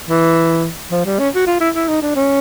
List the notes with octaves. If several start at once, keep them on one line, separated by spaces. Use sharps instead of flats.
E3
F3
G3
C#4
F#4
F4
E4
E4
D#4
D4
C#4